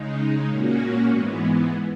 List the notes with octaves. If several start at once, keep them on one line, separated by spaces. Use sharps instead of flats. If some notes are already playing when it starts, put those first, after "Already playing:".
Already playing: C#3 G#3 D#4
A#2 A#3 C#4 F#4
G#2 E3 G#3 B3